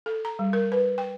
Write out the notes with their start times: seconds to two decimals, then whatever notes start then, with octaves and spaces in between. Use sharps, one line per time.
0.06 A4
0.25 A#5
0.39 G3
0.53 A#4
0.72 B4
0.98 G5